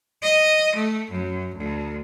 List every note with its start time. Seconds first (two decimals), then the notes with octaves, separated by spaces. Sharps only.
0.22 D#5
0.75 A3
1.11 F#2
1.55 D2